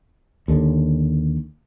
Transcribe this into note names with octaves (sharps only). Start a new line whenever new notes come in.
D#2 D3